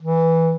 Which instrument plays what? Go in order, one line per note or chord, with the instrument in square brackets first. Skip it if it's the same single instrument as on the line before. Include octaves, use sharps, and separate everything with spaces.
[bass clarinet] E3